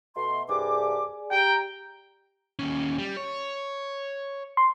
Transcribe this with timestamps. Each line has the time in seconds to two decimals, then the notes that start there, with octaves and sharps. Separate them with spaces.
0.16 B2 A3 C6
0.49 C2 G2 G#4 D5 G#5 D6
1.31 G4 G5 A#5
2.59 D#2 C#4
2.98 G3
3.17 C#5
4.57 C6